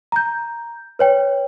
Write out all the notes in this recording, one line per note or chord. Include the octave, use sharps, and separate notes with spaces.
A#5 G6
B4 C#5 G5